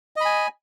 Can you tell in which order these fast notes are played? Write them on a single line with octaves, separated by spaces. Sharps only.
D#5 B5 G#5